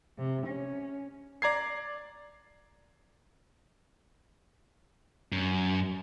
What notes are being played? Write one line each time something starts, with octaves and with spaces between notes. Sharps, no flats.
C3
C#4
D5 A#5 G#6 C7
F#2